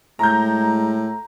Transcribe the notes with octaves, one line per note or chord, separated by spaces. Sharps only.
A2 G#3 A#5 G6